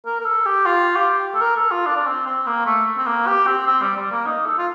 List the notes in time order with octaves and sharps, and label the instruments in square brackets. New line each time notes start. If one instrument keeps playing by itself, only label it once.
[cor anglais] A#4
A#4
A4
G4
F4
G4
A4
A#4
A4
F4
D4
D4
C4
C4
A#3
A3
C4
A#3
G4
C4
C4
G3
G3
A#3
D#4
A4
F4